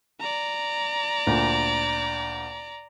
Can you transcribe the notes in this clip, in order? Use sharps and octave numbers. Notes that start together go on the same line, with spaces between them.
D5 A#5
D2 A#2